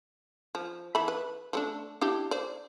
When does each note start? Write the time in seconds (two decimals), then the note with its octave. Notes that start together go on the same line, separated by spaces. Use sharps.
0.55 F3
0.95 E3 E5 B5
1.08 B4
1.53 F3 A3 D4
2.01 D4 E4 G4
2.31 C5 D5